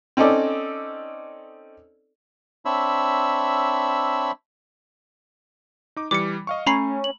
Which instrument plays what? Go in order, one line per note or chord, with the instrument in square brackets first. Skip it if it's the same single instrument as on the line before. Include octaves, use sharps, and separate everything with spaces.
[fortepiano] C4 C#4 D#4 A4 D5
[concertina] C4 D4 C#5 E5 B5 E6
[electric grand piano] D#4 D6
[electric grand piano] E3 G3 [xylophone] D6 C#7
[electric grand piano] D#5 F5 C#6
[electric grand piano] A3 [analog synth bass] C#4 [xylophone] A#5 B5 C7
[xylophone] F#7